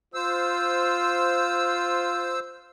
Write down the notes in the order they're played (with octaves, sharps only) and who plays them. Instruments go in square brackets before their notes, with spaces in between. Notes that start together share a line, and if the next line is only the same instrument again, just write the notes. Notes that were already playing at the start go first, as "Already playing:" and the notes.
[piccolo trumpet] F4 [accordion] C5 E6